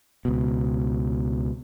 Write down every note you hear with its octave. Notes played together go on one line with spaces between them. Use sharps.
C#2 B2